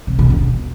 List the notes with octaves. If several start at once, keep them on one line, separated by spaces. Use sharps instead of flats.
C3
B2
E2